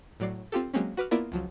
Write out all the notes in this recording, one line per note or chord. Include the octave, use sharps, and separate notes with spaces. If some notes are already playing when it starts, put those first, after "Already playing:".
A2 F#3 D5 C7
C4 F4 G4 A4
F#3 G#3 A#3 C4 C#4
F#4 B4 D6 F6
A#3 B3 E4 F4 A#4 D5
C#2 F3 F#3